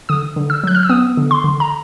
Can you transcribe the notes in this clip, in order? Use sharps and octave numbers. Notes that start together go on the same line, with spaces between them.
D3 D#6
D3
E6
F#3 F#6
F6
E6
B3 D#6
D3
C6
D3
A#5